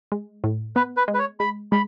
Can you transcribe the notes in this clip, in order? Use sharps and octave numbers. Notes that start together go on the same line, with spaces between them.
G#3
A2
B3 B4
B4
G#3
B4
C#5
G#3 B5
G#3 B5